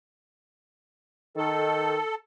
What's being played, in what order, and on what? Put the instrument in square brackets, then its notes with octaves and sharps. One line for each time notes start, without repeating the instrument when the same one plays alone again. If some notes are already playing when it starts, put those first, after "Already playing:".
[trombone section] D#3 [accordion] A4